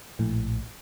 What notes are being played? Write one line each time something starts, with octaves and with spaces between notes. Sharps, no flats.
A#1 A2